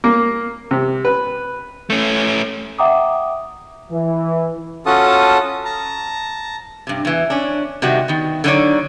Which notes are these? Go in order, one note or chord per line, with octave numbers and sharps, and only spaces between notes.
A#3
C3
B4
A3 C#4
E5 F#5 G5 A#5 D6 D#6
E3
C#4 F4 F#4 A4 A5 D#6
A5 A#5
G2 C3
E2 E3
C#4 D4
C3 D#3 G3 F#4
D#3 B3
D3 F#3 D#4 A#4 C#5 D5